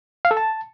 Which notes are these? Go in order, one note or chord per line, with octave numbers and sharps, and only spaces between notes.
F5
A4
A5